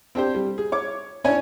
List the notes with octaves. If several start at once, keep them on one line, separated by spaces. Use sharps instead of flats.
C4 D4 G4 C5
G3
G#4
C#5 D6
C#4 D4 E4 C#5 D5 G#5